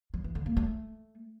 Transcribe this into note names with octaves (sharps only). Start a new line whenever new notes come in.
F3
E3
D3
A#3
A3